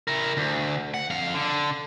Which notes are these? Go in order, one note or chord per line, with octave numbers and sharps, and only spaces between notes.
E4 A#4
D2
F#5
F2 F5
D3